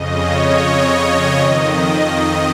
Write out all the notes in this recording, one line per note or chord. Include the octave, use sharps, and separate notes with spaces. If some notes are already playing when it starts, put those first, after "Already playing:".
Already playing: F2 C#3 D#5
C#5
F2 D#3 D#5